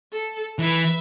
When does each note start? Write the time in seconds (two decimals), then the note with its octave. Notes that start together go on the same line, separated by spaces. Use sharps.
0.12 A4
0.59 E3 B4 E5